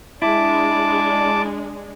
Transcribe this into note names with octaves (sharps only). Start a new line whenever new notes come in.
G#3 D4 E4 A5 D6